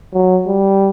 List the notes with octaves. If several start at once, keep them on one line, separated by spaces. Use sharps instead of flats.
F#3
G3